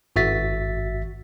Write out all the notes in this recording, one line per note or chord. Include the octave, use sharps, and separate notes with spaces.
G#1 G2 F#4 E5 A6 B6